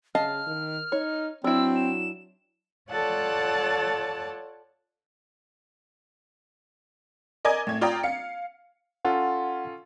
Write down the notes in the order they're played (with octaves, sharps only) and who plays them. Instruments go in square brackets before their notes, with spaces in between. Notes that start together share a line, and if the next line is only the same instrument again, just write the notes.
[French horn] C#3 [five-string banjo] D#5 F5 A5 [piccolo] F6
[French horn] D#3
[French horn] D#4 [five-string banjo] C#5
[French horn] F#3 [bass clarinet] C4 [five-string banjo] D4 E4 [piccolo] E6
[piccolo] E7
[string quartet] F4 A4 C#5 D5 F#5 A5
[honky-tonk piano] A#4 D5 D#5 G#5 D6 G#6
A2 G#6
F4 D5 G5 A#5 D#6
F5 C#7
[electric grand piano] C#4 F4 A4 [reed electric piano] F#5